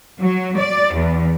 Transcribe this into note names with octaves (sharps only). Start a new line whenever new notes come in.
F#3
D5
E2